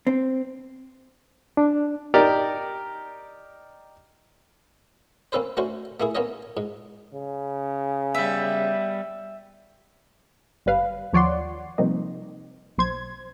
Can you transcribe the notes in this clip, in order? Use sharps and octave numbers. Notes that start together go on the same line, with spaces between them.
C4
D4
D#4 G4 A#4 D5
A#3 C4 C#4 A4 B4 C5
A3 C#4 D4 F#4 C5
A3 A#3 E4 G#4
A#3 B3 C#4 D#4 C#5 D#5
G#2
C#3
G3 B3 E5
G1 G3 B4 F5
D#2 F3 C#5 D5 F#5 C6
C3 F3 G3 A#3 D#4
B1 C5 G#6